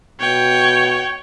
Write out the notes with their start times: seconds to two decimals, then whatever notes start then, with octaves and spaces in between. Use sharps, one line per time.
0.20 B2 C#5 G5